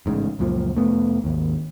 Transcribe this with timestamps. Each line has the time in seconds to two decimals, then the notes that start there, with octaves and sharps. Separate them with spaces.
0.06 A1 G#2 C#3
0.39 C#2 F#2 A#2 F3
0.75 F1 A3 B3
1.24 G#1 D#2